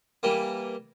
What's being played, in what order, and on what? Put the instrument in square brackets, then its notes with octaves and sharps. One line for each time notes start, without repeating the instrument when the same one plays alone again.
[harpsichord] E3 G3 A#3